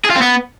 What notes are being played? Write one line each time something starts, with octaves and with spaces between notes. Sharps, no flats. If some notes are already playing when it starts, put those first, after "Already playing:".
G#4
F4
C4
B3